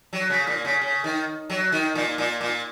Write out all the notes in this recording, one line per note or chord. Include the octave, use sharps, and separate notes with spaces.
F#3
C#3
A#2
C#3
C#3
D#3
F#3
D#3
A#2
A#2
A#2